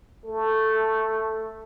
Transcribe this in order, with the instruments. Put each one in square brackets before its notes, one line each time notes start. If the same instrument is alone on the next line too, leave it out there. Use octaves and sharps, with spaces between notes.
[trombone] A3 [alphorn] A4